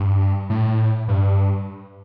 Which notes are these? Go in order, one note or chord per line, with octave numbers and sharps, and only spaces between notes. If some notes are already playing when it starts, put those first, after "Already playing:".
Already playing: G2
A2
G2